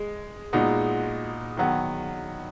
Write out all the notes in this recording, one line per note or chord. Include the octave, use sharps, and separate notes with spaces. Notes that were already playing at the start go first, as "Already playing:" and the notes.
Already playing: G#3
A#2 G#3 B3 D#4 F#4
D#3 F#3 B3